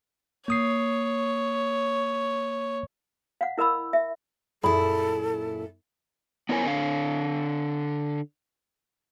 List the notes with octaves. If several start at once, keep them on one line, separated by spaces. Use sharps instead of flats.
A#3 C#5 D#6 C7
F5 F#5
E4 A#4 D#5 B5 E6
E5
F#2 A#2 E4 G#4 A4 B5
B3 D4 E4 A#4 C#5 G#5
D3 F5